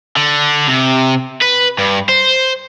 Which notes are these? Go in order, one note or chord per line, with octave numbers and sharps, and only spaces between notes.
D3
C3
B4
G2
C5